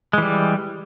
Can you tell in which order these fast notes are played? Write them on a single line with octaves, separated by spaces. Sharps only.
G#3 E3 G3